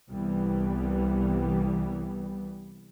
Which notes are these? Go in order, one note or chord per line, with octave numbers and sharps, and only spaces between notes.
C2 E3 G3 B3